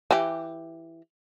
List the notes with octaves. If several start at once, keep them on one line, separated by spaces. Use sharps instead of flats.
E3 G4